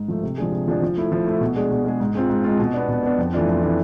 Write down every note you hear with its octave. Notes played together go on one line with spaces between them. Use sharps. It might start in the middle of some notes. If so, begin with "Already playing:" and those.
Already playing: G#2
F3 A3
C3
F3 G#3 D4 G#4
C3
F3 G#3 D4 G#4
F3
A3 E4
F3
A3 E4
B2
G#3 D4 G#4
B2
G#3 D4 G#4
G#2
G#3 C4 F4
G#2
G#3 C4 F4
B2
B3 D4
B2
B3 D4
F2
E3 A3 D4 F4
F2
E3 A3 D4 F4